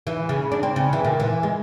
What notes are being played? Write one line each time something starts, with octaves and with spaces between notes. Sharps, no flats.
E3
C#3
D4
C4
C#3
E3
A#2
E3
G#3